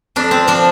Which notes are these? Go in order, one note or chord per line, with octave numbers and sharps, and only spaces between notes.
F2 D4
C4
F3 D4